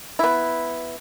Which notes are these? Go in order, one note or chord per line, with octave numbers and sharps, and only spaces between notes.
B3 E4